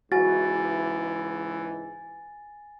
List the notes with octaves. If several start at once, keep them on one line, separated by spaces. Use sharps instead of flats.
C#2 G#2 E3 F#4 G#5 A6